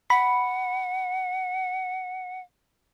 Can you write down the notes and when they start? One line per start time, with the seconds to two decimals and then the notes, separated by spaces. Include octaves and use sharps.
0.10 F#5 B5